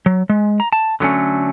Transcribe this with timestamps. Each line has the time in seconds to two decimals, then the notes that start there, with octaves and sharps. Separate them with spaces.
0.06 F#3
0.29 G#3
0.60 A#5
0.73 A5
1.00 D3 F#3 A3 C#4